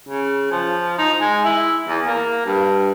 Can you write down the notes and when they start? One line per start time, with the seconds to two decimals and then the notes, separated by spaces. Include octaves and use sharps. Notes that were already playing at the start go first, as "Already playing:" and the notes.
0.09 C#3
0.52 F3
0.98 D#4
1.20 G#3
1.45 E4
1.88 E2
2.07 A#3
2.46 G2